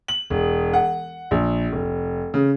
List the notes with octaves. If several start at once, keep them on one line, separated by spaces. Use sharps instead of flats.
F#7
E1
F#5
A#1
F1
C#3